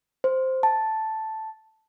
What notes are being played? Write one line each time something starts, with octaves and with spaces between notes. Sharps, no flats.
C5
A5